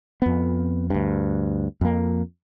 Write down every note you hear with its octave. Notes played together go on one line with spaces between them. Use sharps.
F2 B3
D2 G2
F2 A#3